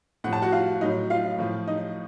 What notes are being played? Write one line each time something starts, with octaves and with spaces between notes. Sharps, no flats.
A2 F3 F#5
A5
F#4 F#5
F4 F5
A2 F#3 D#4 D#5
F4 F5
A2 F3
D#4 D#5